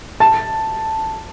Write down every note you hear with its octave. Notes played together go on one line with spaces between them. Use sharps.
A5